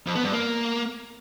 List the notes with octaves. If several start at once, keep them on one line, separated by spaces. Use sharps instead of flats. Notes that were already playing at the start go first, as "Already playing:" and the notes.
F2
B3
G2
A#3